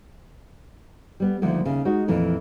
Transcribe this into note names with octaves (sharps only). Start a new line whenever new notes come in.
G3 B3
D2 D3 D#3 F3 A#3
D#2 C#3
G#3 D#4 F#4
F2 A#2 E3 A3 A#4